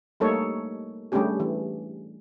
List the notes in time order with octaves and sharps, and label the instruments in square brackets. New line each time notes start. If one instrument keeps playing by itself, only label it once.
[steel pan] G3 A3 A#3 D#4 A4 C#5
G3 A3 C#4 D4 G4 G#4
E3